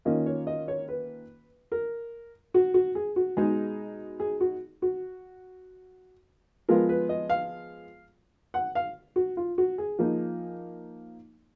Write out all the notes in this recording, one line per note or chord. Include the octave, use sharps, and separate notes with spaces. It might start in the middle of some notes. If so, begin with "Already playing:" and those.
D#3 A#3 C#4 F4 D#5
C#5
D#5
C#5
B4
A#4
F#4
F#4
G#4
F#4
B2 G#3 D#4 G#4
G#4
F#4
F#4
F3 G#3 B3 F4 A#4
B4
D#5
F5
F#5
F5
F#4
F4
F#4
G#4
F3 A#3 D#4